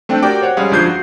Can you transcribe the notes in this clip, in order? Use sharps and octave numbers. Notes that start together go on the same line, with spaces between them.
A3 C4 D4 G5
F#4 G4 A#4 D5 G5 D6
C5 C#5 F#5
G3 G#3 C#4 G#4 C#5 F5
G1 F3 D4 G6 G#6 C7
F#4